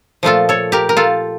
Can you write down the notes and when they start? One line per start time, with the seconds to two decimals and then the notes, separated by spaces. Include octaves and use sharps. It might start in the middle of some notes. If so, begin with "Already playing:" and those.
0.23 A#2 F3 A3 F4 A4
0.49 A4 C#5
0.72 G4 A#4
0.89 A#4
0.97 F4 A4